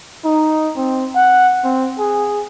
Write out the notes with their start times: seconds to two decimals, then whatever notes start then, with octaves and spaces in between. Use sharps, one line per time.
0.24 D#4
0.76 C4
1.15 F#5
1.64 C4
1.99 G#4